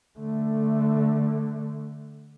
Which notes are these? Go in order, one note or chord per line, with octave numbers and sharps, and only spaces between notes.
D3 A3